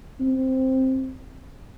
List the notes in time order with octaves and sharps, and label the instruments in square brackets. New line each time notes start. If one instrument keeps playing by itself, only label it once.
[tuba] C4